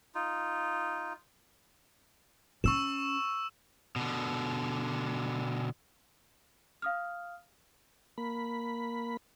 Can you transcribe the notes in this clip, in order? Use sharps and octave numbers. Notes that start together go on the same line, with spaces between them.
D#4 F4
C#4 C#6 E6 E7
B2 D3
F5 D#6 F6
A#3 B5